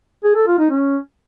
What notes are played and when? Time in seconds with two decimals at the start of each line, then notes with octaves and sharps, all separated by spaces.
0.24 G#4
0.36 A4
0.47 F4
0.59 D#4
0.70 C#4